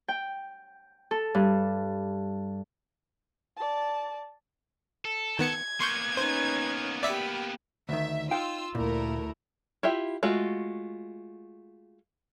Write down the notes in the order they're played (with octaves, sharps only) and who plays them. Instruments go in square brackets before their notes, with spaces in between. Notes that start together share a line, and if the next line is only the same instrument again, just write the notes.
[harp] G5
A4
G2
[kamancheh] D5 A5
[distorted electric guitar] A4
[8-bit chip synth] D#3 B3 C#7 [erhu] G#6
[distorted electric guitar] A#3 B3 [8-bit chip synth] C6 C#6 G6
[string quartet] C#4 D#4 B4 [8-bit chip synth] C5
[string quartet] G4 B5 [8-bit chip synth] D5 E5 B6
[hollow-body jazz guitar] D2 D#3 [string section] E5
[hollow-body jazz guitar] D#4 F5 G5 [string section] F4 E6
[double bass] D2 E4 [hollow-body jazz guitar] A#2 [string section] A3 A#4
[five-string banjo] E4 F4 G4 E5
G#3 A3 F4 F#4